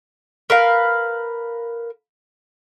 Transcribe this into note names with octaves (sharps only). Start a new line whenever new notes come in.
A#4 B4 F5